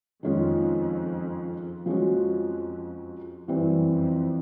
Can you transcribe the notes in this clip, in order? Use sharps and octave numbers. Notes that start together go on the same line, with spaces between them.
F2 D#3 G#3 C#4 F4
F2 F3 G#3 C#4 F#4
F#2 E3 G3 C4
F2